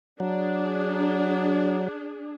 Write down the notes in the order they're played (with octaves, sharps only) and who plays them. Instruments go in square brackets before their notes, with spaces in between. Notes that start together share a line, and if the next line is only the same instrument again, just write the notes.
[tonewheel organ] F#3 [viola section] D4 G#4